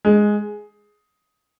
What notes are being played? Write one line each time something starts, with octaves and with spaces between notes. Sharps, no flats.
G#3